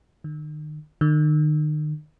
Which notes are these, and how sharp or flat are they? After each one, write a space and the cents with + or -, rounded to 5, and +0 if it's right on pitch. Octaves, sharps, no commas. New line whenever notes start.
D#3 -40
D#3 -40